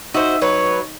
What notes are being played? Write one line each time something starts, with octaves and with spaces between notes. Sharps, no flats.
D#4 F#4 C5 E5
F#3 B4 C#5